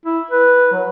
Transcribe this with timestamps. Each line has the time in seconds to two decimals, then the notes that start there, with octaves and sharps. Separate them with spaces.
0.06 E4
0.31 B4
0.72 F#3